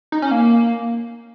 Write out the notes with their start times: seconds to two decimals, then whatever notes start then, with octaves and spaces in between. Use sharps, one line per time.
0.12 D#4
0.22 C#4
0.31 A#3